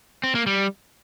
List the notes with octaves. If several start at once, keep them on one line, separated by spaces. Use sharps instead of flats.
C4
A#3
G3